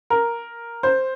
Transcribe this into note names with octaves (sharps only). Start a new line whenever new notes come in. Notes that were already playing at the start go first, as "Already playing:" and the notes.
A#4
C5